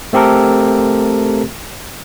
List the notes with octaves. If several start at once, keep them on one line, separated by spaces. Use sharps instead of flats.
A3 C4 G4 A4 A#4